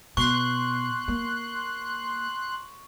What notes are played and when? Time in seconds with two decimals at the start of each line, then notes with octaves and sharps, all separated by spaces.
0.17 B2 C6 C#6 F#6
1.08 A#3